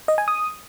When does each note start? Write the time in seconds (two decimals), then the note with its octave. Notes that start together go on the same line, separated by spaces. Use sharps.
0.08 D#5
0.18 G#5
0.28 D#6